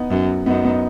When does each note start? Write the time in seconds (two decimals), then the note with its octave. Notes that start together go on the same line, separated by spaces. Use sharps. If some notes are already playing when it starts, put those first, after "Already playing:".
Already playing: B3 D#4
0.10 F#2
0.46 F#2 B3 D#4
0.64 B3 D#4